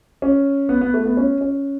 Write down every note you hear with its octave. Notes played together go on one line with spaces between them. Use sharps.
C#4
B3
B3
A3
B3
C#4
C#4